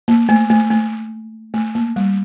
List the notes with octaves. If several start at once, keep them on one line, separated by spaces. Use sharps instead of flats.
A#3
A3
A3
A3
A3
A#3
G3